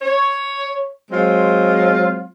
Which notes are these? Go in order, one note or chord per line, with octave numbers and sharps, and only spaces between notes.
C#5
F#3 G#3 C4 F4